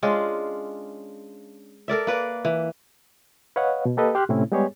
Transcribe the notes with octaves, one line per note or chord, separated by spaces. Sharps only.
G#3 C#4 D4 F4
A4 A#4 D5 E5
A#3 B4 D5
E3
B4 C#5 D#5 F5 F#5
B2
A#3 G4 A4 B4 D#5
G4 C6 F6 F#6
A2 C3 A3 C4 C#4 E4
G3 G#3 B3 G4 G#4 C#5